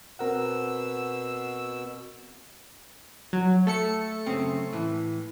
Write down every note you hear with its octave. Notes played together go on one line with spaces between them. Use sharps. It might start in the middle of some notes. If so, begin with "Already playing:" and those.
B2 C4 A#4 F#5 E6
F#3
A3 A4 C#7
F#2 C#3 C4
A2 E3